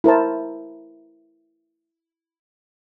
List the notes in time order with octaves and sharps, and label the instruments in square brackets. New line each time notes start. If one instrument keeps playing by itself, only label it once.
[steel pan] E4 A#4 C5 A5